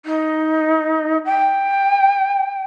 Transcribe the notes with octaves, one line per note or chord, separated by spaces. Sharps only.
D#4
G5